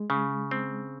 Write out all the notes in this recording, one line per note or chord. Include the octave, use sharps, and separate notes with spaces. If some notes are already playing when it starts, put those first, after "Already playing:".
Already playing: G#3
C#3
C4